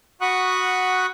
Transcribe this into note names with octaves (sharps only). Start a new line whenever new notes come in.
F#4 F#5 B5 C#6 D#6 F#6